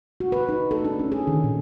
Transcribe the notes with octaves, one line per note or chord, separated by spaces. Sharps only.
F#4
B4
D#4
A4
D4
C#4
G#4
D#3
A#2